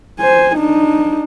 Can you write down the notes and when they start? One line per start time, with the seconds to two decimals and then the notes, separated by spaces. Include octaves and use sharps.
0.20 C5 G#5
0.57 D4 D#4